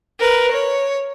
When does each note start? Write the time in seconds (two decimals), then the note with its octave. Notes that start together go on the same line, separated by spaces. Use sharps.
0.20 A#4 B4
0.52 C#5